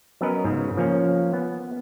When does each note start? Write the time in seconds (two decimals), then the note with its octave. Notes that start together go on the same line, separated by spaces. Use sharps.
0.21 F#3 B3 C#4 A#4 B4 D#5
0.44 G#2 C#3
0.77 F3 A#3 C#4
1.33 B3